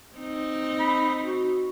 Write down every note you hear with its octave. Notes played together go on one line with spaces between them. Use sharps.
C4 D#4
B5
F#4